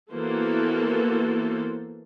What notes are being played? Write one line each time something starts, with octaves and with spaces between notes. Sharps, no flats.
E3 A#3 B3 F#4 A4 C5